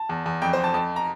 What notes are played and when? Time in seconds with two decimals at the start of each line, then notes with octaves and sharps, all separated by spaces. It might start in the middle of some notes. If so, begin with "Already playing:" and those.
Already playing: A5
0.09 E2
0.26 E2
0.42 F2 G5
0.53 C5
0.58 F2
0.64 A5
0.74 F2 A5
0.96 A#5